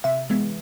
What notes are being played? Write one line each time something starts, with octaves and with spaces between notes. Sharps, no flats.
C3 E5
E3 G#3 B3